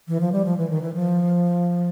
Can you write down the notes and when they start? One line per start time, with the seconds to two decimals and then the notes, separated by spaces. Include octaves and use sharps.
0.08 E3
0.21 F3
0.32 G3
0.45 F3
0.58 E3
0.70 D#3
0.82 E3
0.94 F3